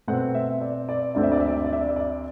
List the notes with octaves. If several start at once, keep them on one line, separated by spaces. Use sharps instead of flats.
B2 A3 C4 F#5
E5
D5
D5
D2 D3 A3 C4 D5
E5
D5
E5
D5
E5
D5
E5
D5
E5
D5